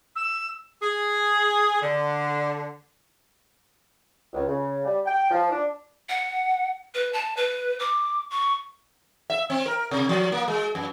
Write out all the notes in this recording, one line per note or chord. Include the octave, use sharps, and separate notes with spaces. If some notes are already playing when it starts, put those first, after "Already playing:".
E6
G#4
D3
C#2
C#3
G3
G5
F3
D4
F#5
B4
A5
B4
D6
C#6
E5
C4
A#4
C3
F3
A#3
G#3
F#2